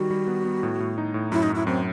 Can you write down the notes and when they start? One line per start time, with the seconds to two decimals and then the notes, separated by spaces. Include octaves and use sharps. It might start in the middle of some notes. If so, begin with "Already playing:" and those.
Already playing: D#3 G3 F#4
0.11 G3
0.27 B3
0.45 B3
0.63 A2
0.80 A2
0.98 D#4
1.14 A2
1.32 F#2 E4
1.43 D#4
1.50 F#2
1.55 E4
1.67 F#2 C4